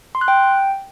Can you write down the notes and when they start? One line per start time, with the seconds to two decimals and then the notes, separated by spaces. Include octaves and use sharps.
0.15 C6
0.21 F#6
0.28 G5